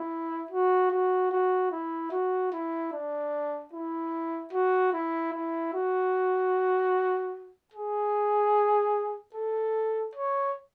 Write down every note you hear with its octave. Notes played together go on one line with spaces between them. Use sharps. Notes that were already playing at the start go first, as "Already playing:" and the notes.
Already playing: E4
F#4
F#4
F#4
E4
F#4
E4
D4
E4
F#4
E4
E4
F#4
G#4
A4
C#5